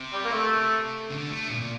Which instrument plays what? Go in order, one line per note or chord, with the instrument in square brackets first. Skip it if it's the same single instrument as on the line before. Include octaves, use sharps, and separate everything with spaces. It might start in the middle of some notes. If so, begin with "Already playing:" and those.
Already playing: [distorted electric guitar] C3
[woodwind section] G3
A#3
A3
[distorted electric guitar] D3
A3
A#2
A#2